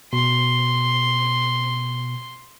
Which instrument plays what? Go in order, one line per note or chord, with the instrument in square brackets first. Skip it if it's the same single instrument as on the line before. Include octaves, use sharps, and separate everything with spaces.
[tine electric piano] B2 [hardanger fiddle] C6